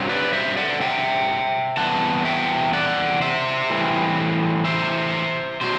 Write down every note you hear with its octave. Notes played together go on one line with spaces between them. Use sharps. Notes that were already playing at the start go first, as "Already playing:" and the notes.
Already playing: G2 F#3 C4
B4 D5
D5
C5 E5
D5 F#5
E5 G5
E2 C3 G3 B3 F#5 A5
E5 G5
D5 F#5
C5 E5
A2 E3 G3 C4
C5 E5
B2 F#3 C5